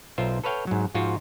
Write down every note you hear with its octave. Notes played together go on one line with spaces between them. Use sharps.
B1 F4 A#4 C5 E5
A4 B4 C#5 F5 G5
G#2 F#3
G#2 F3 F4 F#4